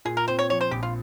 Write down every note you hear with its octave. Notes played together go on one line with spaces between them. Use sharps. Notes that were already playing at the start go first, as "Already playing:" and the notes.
A#2 G#4
A#4
C4 C5
C#5
F3 C#5
C5
A#1 G4
F4